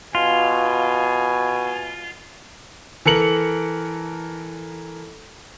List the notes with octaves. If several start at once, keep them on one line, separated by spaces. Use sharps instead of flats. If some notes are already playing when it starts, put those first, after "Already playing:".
B2 F4 G#5
E3 A4 A#4 C#7 F#7